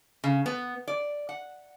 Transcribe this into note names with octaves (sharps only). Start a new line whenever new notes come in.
C#3
B3
D5
F#5